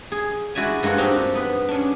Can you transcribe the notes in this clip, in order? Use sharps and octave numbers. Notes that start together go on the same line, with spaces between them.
G#4
G#3 E4 F#4 D5 E5 G#5
G2 G#3 A#3 F#4 F#5
C4 D4 D#4 G4
B3 B4
C#4 D4